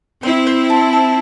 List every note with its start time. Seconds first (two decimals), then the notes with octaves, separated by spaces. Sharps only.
0.23 C4 E4 C5
0.47 C5
0.70 A5
0.93 A5